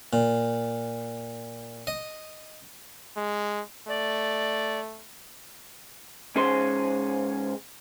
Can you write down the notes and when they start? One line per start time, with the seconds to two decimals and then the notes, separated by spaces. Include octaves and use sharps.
0.13 A#2
1.87 D#5
3.17 G#3
3.89 A3 D5
6.36 G#2 C#4 G#4 C5 C6